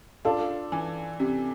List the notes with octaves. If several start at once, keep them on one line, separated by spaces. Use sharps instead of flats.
D4 F4 A4
E3
C3